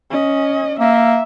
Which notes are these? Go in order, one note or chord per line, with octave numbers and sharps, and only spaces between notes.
C#4 D#5
A#3 E5